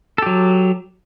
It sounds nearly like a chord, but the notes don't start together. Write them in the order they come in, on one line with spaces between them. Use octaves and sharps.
A4 G4 F#3